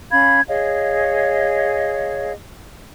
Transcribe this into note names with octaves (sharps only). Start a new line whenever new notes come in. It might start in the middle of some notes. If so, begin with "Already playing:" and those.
C#4 F5 B5 G#6
G#4 C#5 D#5 F5